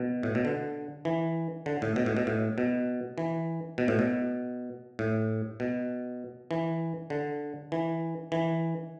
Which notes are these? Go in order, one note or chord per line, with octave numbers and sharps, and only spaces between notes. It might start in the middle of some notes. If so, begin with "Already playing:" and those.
Already playing: B2
A2
B2
D3
E3
D3
A2
B2
A2
B2
A2
B2
E3
B2
A2
B2
A2
B2
E3
D3
E3
E3